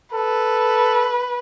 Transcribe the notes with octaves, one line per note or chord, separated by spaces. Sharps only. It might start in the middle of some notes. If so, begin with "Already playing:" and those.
A4 B4